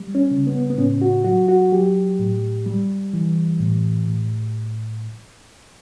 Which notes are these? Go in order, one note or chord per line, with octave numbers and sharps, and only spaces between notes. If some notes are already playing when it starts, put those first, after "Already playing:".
Already playing: G3
C#4
C#3
B3
B3
A2 C#4
F#4
F#3 F#4
F#4
F#3 G4
A2
G3
E3
A2
A2